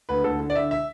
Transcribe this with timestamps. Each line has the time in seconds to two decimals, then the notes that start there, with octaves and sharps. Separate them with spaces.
0.09 D2 B4
0.24 D2 A4
0.40 D3
0.50 D5
0.55 D3 E5
0.71 E5